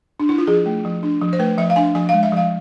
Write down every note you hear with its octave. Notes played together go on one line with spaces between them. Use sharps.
D4
E4
F4
F3 G#4
A3
F3
D4
F3
C5
A3 B4
F3 E5
F5
D4 G#5
F3 G#5
G#3 F5
E5
F3 F5